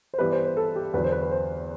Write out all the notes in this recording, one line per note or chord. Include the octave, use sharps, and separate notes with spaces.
C5
G2 E3 G3 B3 B4
C5
C5
A4
G4
E2 D3 F#3 B4
C5
B4
B4
C5